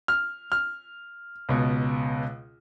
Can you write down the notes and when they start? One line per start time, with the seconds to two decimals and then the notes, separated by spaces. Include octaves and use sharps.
0.08 F6
0.52 F6
1.49 C#2 B2